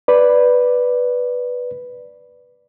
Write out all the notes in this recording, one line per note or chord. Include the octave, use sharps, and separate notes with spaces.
B4 D5